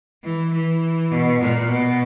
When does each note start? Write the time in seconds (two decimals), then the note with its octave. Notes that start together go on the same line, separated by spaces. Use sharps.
0.23 E3
0.52 E3
1.11 B2
1.40 A#2
1.68 B2